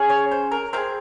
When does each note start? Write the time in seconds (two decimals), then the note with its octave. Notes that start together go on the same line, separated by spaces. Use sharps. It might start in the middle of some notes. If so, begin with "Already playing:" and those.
Already playing: C#4 G#4
0.10 C#5
0.31 C5
0.52 A#4
0.73 C4 F4 G#4 A#4